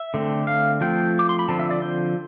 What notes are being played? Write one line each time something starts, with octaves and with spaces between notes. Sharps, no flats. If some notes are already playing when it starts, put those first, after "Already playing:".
Already playing: E5
D3 A3 C4
F5
F3 A3 C4 G5
D6
C6
B5
D3 F3 C4 A5
E5
D5
C5